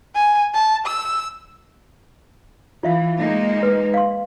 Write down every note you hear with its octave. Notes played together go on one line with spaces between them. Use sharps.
G#5
A5
E6
E3 F4 E5 F5
G#3 A#3 D#4
B4
F5 C6